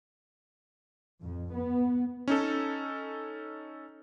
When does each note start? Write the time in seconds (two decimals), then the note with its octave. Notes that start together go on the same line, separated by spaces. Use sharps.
1.21 F2
1.54 B3
2.28 C#4 D#4 A4